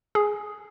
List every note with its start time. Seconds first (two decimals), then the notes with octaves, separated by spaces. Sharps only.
0.15 G#4